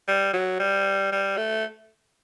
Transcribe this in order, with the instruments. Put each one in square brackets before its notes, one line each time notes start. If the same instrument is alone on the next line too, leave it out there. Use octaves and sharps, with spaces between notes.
[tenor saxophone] G3
F#3
G3
G3
A3